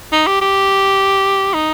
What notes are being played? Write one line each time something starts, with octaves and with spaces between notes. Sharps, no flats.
D#4
G4
G4
D#4